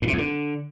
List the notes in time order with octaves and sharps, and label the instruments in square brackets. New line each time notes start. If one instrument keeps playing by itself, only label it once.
[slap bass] A2
C3
E2
D3